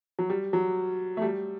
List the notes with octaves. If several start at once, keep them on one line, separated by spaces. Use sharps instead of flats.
F#3
G3
F#3
A3
G3